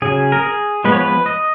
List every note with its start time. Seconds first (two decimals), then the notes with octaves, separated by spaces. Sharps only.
0.02 C#3 F#3 C#4 G#4
0.32 A#4
0.43 G#4
0.84 F3 G#3 B3 B4
0.92 C#5
1.00 B4
1.26 D#5